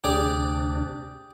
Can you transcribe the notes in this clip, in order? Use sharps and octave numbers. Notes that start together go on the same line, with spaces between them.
D2 C3 D4 G4 G#4 D5